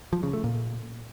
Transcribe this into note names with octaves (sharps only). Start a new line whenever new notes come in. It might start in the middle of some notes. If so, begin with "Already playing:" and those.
F3
C#3
A3
A#2